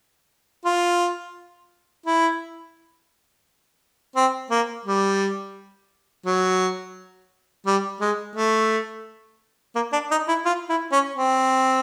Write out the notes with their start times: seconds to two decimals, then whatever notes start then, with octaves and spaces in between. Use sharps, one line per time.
0.65 F4
2.06 E4
4.16 C4
4.50 A#3
4.86 G3
6.26 F#3
7.66 G3
8.01 G#3
8.36 A3
9.75 A#3
9.93 D4
10.11 D#4
10.28 E4
10.45 F4
10.69 E4
10.92 C#4
11.16 C4